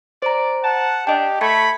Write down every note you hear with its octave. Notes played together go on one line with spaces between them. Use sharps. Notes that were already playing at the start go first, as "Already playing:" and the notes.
C5 D5 A#5
F#5 A5
D4 G4 D#5 G5
A3 B5 G#6 B6 C#7